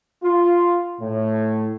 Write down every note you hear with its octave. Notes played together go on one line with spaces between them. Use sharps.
F4
A2